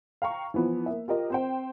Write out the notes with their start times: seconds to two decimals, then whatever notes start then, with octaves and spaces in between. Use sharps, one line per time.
0.22 F5 G5 A#5 C#6
0.54 E3 F3 B3
0.86 A#3 E5
1.08 F4 G4 A#4 D#5
1.30 C4 C5 G5